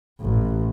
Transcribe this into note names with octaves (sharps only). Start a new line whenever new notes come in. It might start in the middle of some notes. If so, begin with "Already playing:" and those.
A1